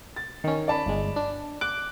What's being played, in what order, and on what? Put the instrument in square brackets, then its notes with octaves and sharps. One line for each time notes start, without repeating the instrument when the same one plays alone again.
[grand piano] A6
[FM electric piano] D#3 C#4
[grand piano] D5 A5 B5
[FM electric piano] G1 G#3
D4
[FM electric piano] D6 [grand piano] F#6